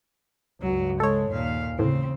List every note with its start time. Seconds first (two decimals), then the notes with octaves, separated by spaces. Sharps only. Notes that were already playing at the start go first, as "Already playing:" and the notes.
0.62 C#2 G2 F#3
1.00 G#3 A4 C#5
1.31 D#2 A#2 F5
1.79 A2 C#3 E3 C4